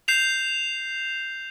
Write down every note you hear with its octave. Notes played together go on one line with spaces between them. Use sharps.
G6 C7 E7 F7